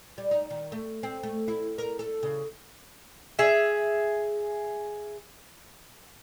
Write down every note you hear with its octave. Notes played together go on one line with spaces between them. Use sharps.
G3
D#4
D#3
A3
C4
A3
E4
A#4
A4
C#3
G#4 E5